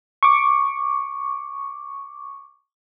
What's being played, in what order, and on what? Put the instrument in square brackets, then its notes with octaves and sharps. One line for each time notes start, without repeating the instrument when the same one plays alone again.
[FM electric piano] C#6 D6